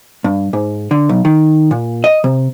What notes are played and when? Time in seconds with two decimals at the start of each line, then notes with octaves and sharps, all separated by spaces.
0.24 G2
0.53 G#2
0.91 D3
1.09 B1
1.25 D#3
1.71 A#2
2.04 D#5
2.24 C3